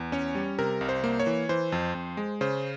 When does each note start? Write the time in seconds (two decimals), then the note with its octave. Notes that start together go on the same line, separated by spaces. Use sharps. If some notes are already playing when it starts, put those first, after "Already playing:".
Already playing: E2
0.12 C#4 C#5
0.35 G3
0.59 C3 A#4
0.81 C2
0.89 C5
1.04 A#3
1.20 C#5
1.27 E3
1.49 E3 C5
1.72 F2
1.95 F2
2.17 G#3
2.41 C#3 C5